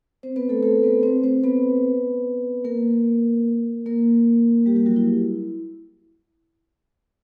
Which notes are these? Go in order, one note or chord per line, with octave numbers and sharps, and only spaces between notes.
C4 C5
B3 B4
A3 A4
A3 A4
B3 B4
C4 C5
C4 C5
B3 B4
A#3 A#4
A#3 A#4
G3 G4
G3 G4
F#3 F#4
E4